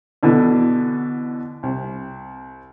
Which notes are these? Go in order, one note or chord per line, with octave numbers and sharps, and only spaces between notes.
B2 D3 E3
C2